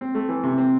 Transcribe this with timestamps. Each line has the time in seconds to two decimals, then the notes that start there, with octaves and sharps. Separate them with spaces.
0.01 C4
0.15 A3
0.29 E3
0.43 C3
0.58 C4